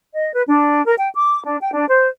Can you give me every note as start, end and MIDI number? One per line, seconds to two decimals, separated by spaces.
0.13 0.32 75
0.33 0.42 71
0.47 0.84 62
0.84 0.93 70
0.98 1.09 79
1.15 1.41 86
1.45 1.58 62
1.60 1.71 79
1.73 1.86 62
1.87 2.07 72